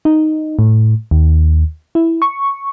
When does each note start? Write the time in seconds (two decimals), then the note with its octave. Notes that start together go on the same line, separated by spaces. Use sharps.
0.05 D#4
0.59 A2
1.11 D#2
1.95 E4
2.22 C#6